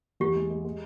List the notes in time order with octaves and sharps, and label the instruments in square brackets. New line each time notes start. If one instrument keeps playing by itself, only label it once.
[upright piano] E2 [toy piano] G4
[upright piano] G#3
G#3
G#3